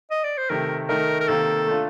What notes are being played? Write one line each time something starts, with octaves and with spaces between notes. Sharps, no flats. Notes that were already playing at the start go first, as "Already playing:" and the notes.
D#5
D5
C5
C3 D#3 A3 A#4
D#3 A3 D#4 A#4
A#4
C3 D#3 A#3 A4
A3 D4 F4